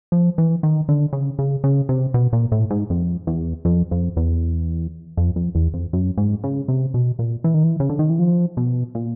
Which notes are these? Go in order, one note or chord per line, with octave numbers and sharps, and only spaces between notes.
F3
E3
D#3
D3
C#3
C#3
C#3
C3
B2
A#2
A2
G#2
F2
E2
F2
F2
E2
F2
F2
E2
F2
F#2
G#2
C#3
C3
B2
A#2
E3
D#3
E3
C#3
D3
D#3
E3
F3
B2
A#2